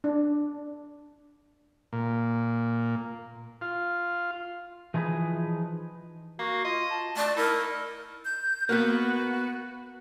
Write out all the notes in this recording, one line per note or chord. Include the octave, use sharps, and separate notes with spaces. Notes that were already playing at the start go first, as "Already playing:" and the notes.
D4
A#2
F4
E3 F3 D#4 G#4 B4
A#3 F#4
F4 D#5
A5
A3 D5 A5
D#4 E4 A#4
G6
A#3 B3 F#4